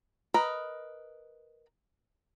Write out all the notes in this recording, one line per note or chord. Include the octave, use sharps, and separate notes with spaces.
A#4 B4 D#5